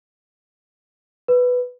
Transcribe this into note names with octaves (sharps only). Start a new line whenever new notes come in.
B4